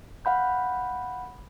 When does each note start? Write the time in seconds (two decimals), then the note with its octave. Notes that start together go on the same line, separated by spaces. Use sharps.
0.25 F5 F#5 B5 G6